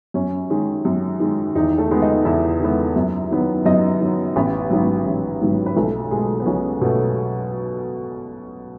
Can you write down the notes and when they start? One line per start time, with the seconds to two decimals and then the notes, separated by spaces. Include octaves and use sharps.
0.14 F#2 C#4
0.50 D#3 G#3
0.85 F#2
1.20 D#3 G#3
1.55 E2 D#3 D#4
1.78 A3 A4
1.91 D#3 G#3 B3
2.02 D#4 D#5
2.25 E2 E4 E5
2.60 D#3 G#3 B3
2.96 F#2
3.31 D#3 F#3 B3
3.65 F#2 D#4 D#5
4.01 D#3 F#3 B3
4.36 A1 B3 B4
4.71 G#2 D#3 F#3
5.06 A1
5.41 G#2 D#3 F#3
5.66 B4
5.76 B1 A3 A4
6.11 B2 G#3 A3 G#4
6.40 B3
6.46 B1 C#4
6.81 B2 A3